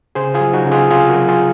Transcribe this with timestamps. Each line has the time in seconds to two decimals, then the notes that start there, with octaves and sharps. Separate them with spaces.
0.15 C#3 G#4 C5
0.34 F4 G#4
0.40 F#3
0.53 D#4 F#4
0.65 C#3
0.71 F4 G#4
0.90 C3 F4 G#4
1.09 F#4 A#4
1.15 F#3
1.29 F4 G#4